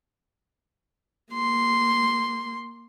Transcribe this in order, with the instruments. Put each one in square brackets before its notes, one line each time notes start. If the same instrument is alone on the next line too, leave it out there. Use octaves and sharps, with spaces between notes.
[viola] A#3 C6